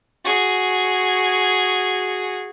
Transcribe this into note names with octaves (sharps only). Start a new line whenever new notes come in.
F#4 G#4